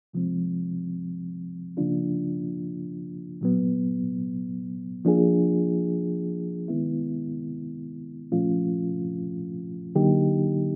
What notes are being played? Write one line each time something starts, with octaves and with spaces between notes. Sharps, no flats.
C3 F3 G#3 C4
C#3 F3 A#3 D4 F4
A#2 F#3 B3
F3 A#3 D4 F4 G#4
D#3 G#3 B3 E4
A#2 F3 A3 C#4 F4
D3 F#3 A#3 D#4 G4